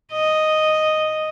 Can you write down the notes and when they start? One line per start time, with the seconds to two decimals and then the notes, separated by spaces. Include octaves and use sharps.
0.13 D#5